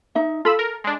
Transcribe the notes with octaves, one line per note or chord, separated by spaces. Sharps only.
D#4 E5
F4 A4 B5 E6
A#4
G#3 D4